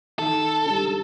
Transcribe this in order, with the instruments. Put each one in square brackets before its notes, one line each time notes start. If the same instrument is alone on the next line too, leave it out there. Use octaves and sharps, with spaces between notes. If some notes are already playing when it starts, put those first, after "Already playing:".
[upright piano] D#3 [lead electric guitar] A4
[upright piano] G3 D4